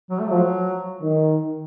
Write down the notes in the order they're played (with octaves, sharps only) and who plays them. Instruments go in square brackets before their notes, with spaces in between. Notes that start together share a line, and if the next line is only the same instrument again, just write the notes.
[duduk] F#3
A3
[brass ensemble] F3 [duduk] F#3
[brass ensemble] D#3